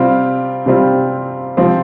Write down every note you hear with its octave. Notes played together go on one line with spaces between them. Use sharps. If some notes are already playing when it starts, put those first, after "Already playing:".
Already playing: C3 G3 C4 F4
C3 G3 C4 F4
C3 F3 C4